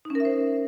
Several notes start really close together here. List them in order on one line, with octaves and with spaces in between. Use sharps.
D#4 C#4 A#4 E5 C5